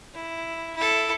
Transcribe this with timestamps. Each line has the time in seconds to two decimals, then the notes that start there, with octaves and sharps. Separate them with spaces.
0.15 E4
0.77 E4 A4